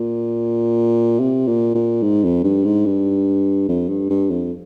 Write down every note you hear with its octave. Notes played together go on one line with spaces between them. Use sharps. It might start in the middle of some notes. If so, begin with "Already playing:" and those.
Already playing: A#2
C3
A#2
A#2
G#2
F2
G2
G#2
G2
F2
G2
G2
F2